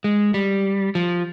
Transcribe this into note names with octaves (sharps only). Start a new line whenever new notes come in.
G#3
G3
F3